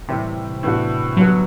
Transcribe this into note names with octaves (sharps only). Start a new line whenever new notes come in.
A2 C3 E3 G3 C4 G4
A2 E3 B3 D4 F#4
D3 F#3 G3 B3 F#4